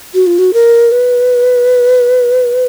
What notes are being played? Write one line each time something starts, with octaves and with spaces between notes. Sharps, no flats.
F#4
F4
F#4
A#4
B4